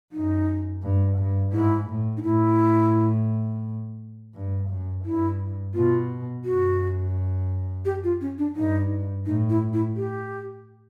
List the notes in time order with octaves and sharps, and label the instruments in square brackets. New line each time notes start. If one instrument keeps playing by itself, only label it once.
[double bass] F#2 [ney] D#4
[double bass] G2
G2
[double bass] G#2 [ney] E4
[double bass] A2
[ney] D#4
[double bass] A2 [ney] E4
[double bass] G2
F#2
[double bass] G2 [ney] E4
[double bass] B2 [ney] F4
[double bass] F#2 [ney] F#4
[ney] G4
F4
C#4
D4
[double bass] G2 [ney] D#4
[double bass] A2 [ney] D#4
[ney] E4
E4
G4